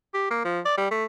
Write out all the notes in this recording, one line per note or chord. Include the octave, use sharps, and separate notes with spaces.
G4
A#3
F3
D5
G3
A3